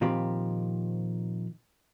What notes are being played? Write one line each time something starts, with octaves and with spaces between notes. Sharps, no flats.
A#2 D#3 F3 C4 G4 B5